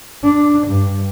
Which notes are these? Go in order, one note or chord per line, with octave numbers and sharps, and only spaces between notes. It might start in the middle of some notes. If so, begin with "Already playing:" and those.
D4
G2